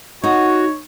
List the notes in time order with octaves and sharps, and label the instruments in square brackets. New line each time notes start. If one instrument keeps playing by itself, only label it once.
[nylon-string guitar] D#4 [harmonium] F#4 [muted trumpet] C#5